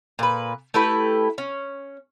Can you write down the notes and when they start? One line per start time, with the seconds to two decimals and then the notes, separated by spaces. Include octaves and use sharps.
0.19 A#2 B4
0.74 A3 E4 G4 B4
1.38 C#4